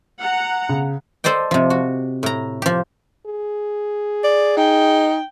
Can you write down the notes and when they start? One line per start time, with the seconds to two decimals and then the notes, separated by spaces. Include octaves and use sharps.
0.21 F#5 A#5
0.69 C#3
1.24 A4 C5 D5 D#5 G5
1.51 C3 F3
1.70 F#4
2.23 A2 A#5
2.62 F3 G4
3.26 G#4
4.24 D5
4.57 D#4 G5